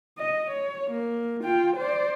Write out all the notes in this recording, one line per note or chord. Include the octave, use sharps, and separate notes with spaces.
D#5
C#5
A#3
F4 G5
C5 D5